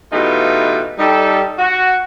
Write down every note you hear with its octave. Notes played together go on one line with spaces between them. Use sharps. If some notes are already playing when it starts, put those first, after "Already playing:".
B2 E3 A3 D#4 F4 G4
G3 D#4 A4
F#4